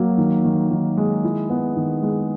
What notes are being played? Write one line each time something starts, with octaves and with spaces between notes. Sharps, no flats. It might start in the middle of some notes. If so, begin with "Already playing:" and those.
Already playing: F#3 A#3
D#3
D#3
D#3
G#3
E4
B3
D#3
G#3